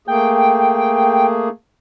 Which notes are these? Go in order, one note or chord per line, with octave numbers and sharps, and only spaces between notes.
A3 A#3 G#4 G5